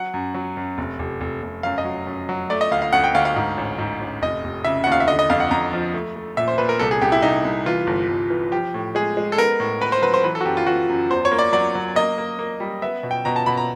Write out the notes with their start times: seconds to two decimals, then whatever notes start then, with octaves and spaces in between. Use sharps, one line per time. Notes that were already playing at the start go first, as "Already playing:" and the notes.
Already playing: F#3 F#5
0.14 F#2
0.34 F#3
0.57 F#2
0.78 F1
0.99 F1
1.21 F1
1.43 F1
1.63 F#2 F5
1.78 D#5
1.85 F#3
2.07 F#2
2.29 F#3
2.50 A3 D5
2.61 D#5
2.71 D2 F5
2.82 F5
2.93 D2 F#5
3.04 G5
3.15 D2 F5
3.25 F5
3.36 G#2
3.57 A1
3.78 G#2
4.01 A1
4.22 F1 D#5
4.44 F1
4.65 C#3 E5
4.84 D#2 F#5
4.92 F5
5.00 E5
5.08 D3 D#5
5.19 D#5
5.30 F2 F5
5.40 F#5
5.51 F2 A#5
5.73 F3
5.94 A3
6.16 A3
6.37 A#2 E5
6.48 C5
6.58 A#2 B4
6.69 A#4
6.79 C2 A4
6.91 G#4
7.02 C2 G4
7.12 E4
7.22 C2 D#4
7.45 C2
7.66 E3 F4
7.87 G1
8.09 G1
8.30 E3
8.51 F3 G4
8.74 A2
8.95 G#3 G#4
9.17 G#3
9.32 A4
9.38 B3 A#4
9.60 A2
9.81 B3 B4
9.92 C5
10.02 F#3 B4
10.14 C5
10.24 E3 B4
10.35 A4
10.41 F#4
10.45 F#2 G4
10.57 F4
10.67 E3 F#4
10.89 F#2
11.10 E2 C5
11.25 C#5
11.31 A#3
11.39 D5
11.53 F#3 D5
11.75 F#3
11.96 A#3 D#5
12.18 A#3
12.39 A#3
12.60 G3
12.82 B3 E5
13.03 B2
13.11 G5
13.25 B2 A#5
13.36 A5
13.46 B2 B5
13.57 A#5